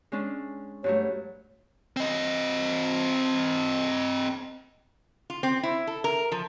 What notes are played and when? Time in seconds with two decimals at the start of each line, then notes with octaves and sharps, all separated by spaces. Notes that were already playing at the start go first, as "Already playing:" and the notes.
0.12 G#3 C#4 D4
0.84 G2 F#3 A3 C#5
1.97 C4 D#5
5.30 F4
5.43 C4
5.63 E4
5.87 A4
6.04 A#4
6.32 F3